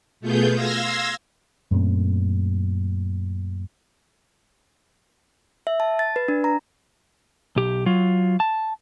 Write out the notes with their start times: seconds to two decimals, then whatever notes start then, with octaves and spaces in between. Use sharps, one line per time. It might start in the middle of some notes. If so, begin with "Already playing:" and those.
0.20 B2 A3 B3 F4 G#4 G6
0.54 F5 C6 E6 G#6 A#6
1.71 F#2 A#2 A3 C4
5.67 E5
5.80 A5
5.99 A6
6.16 B4
6.28 D4
6.44 A#5
7.56 B1 G4
7.86 F#3 F4
8.40 A5